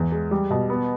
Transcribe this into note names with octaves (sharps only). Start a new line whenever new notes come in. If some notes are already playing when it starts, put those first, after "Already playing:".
Already playing: E2
G#3
G3
B2
B3